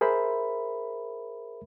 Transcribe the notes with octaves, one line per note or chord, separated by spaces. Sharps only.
G#4 A#4 C5 E5 B5